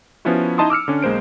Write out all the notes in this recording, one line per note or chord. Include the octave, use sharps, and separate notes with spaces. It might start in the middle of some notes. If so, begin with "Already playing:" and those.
F3 B3 C#4 E4 F#4
D#4 E4 D#5 A5 C6 D#6
D6 E6 F6 C#7
D3 C#4 D4
B1 G#3 A#3 C5 D7